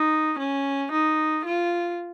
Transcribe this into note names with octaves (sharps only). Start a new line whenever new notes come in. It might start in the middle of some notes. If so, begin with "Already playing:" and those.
Already playing: D#4
C#4
D#4
F4